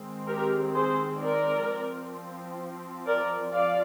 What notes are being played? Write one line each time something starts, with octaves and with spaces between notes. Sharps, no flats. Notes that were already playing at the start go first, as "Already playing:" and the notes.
Already playing: D#3 G#3 C4
G4 A#4
G#4 C5
A#4 D5
F3 C4
A#4 D5
F3 D5 F5